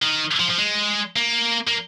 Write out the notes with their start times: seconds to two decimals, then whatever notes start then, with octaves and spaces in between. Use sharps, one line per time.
0.02 D#3
0.40 F3
0.50 F3
0.59 G#3
1.16 A#3
1.67 A#3